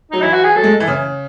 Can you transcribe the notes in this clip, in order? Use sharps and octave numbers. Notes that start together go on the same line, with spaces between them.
F#3 D#4
E3 E4
F#4
G#4
F#3 A4
G#3
E3
C#3